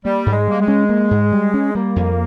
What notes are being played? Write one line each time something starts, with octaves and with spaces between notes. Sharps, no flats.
G3 A#3
G#2
G#3
G3 A#3
G#3
C#4
A#3
G#2
G3
C#4
G3 A#3
F2